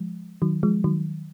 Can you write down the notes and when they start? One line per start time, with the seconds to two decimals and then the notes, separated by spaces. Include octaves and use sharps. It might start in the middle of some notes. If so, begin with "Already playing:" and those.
Already playing: F3 G#3
0.42 D#3 F#3
0.63 F3 G#3
0.84 D#3 F#3